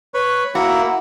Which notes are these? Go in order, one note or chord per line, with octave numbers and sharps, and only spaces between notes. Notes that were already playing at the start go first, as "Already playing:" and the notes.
B4 C#5
A#3 E4 F#4